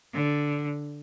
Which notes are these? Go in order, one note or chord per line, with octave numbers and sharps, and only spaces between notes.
D3